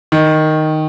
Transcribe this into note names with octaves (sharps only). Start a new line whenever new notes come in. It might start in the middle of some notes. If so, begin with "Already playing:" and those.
D#3